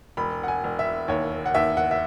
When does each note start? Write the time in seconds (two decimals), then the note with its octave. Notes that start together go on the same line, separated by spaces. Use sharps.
0.17 E1 B5
0.43 F#5
0.48 G#5
0.64 E1
0.79 E5
1.08 D#2 C#5
1.46 F#5
1.55 D#2 E5
1.77 F#5
1.91 E5